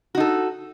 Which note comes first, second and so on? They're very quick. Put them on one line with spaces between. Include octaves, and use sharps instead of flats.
F#4 D#4 A4